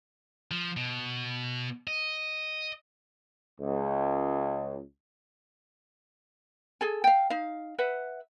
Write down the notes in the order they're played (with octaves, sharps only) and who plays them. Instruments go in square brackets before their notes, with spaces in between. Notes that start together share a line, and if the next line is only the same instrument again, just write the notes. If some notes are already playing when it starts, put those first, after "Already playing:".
[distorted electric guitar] F3
B2
D#5
[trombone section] C#2
[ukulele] G#4 A4 G#5
F5 G5
D#4 F5
B4 E5 F#5